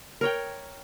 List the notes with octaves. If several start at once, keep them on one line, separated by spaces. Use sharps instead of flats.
A#4 C#5 G5